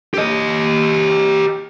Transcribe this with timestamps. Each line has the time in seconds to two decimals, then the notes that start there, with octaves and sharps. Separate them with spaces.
0.14 G4 D#5